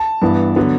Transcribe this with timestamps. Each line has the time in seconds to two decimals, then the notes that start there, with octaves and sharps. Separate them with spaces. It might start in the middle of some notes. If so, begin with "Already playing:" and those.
Already playing: A5
0.22 G2 E3 B3
0.56 D3 F#3 B3